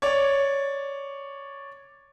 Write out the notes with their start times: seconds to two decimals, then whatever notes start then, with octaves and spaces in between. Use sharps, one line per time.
0.02 C#5 D5